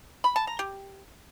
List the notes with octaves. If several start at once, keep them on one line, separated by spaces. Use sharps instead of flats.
B5
A5
A#5
G4